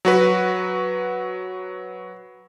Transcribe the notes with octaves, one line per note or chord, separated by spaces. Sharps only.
F#3 F#4 B4